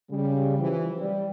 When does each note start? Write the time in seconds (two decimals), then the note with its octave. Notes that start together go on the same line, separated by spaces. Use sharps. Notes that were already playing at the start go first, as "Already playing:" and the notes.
0.10 C#3 G3
0.58 E3 F3
1.00 G3